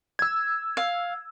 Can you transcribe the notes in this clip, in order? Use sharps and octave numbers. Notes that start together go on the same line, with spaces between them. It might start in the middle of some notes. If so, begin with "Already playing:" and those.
E6 G#6
F5